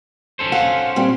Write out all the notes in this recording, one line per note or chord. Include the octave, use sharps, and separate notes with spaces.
C#4 A4 C5
F5 F#5
A#2 G3 C4